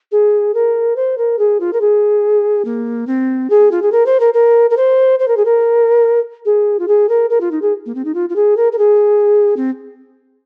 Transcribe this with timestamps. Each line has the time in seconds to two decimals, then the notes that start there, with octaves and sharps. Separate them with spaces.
0.12 G#4
0.54 A#4
0.96 C5
1.18 A#4
1.39 G#4
1.60 F4
1.73 A#4
1.81 G#4
2.65 A#3
3.07 C4
3.50 G#4
3.72 F4
3.82 G#4
3.92 A#4
4.06 C5
4.20 A#4
4.34 A#4
4.70 A#4
4.77 C5
5.19 C5
5.28 A#4
5.37 G#4
5.45 A#4
6.45 G#4
6.79 F4
6.88 G#4
7.09 A#4
7.30 A#4
7.41 F4
7.51 D#4
7.62 G#4
7.86 A#3
7.95 C4
8.05 D#4
8.15 F4
8.30 F4
8.36 G#4
8.57 A#4
8.72 A#4
8.78 G#4
9.57 C4